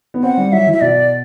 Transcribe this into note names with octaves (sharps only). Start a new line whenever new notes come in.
B3
C4 F#5
G3
F#3 E5
E3
E5
B2 D5